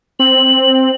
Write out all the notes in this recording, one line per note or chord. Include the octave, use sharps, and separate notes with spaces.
C4 F#7